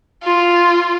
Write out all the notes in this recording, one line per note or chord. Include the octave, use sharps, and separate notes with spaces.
F4